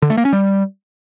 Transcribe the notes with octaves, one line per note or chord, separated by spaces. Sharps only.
D3
A3
A#3
C#4
G3